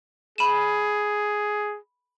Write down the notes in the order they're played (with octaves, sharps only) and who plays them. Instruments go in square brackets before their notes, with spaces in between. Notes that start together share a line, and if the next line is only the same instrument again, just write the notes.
[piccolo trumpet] G#4 [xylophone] B5 D#7 E7